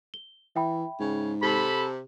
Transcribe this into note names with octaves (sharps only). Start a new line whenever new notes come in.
G7
E3 E5 G5 B5
G#2 C#3
C3 G4 A4 B5